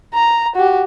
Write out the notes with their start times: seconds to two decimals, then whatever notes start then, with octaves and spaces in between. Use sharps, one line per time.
0.14 A#5
0.56 F#4 G4